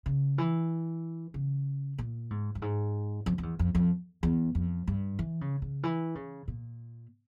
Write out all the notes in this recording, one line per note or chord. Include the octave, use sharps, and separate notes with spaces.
C#3
E3
C#3
A#2
G#2
G2
G#2
F2
F2
E2
F2
F2
E2
F2
G2
E3
C#3
C#3
E3
C#3
A#2